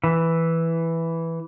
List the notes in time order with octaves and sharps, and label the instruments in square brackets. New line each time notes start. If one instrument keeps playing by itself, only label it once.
[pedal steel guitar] E3